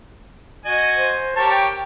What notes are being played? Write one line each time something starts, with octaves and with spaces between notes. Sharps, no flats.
F#4 D#5 G#5
C5
G4 A#4 C#5 A5
G5